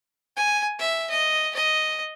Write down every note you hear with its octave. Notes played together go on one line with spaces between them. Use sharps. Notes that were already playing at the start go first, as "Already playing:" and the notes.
G#5
E5
D#5
D#5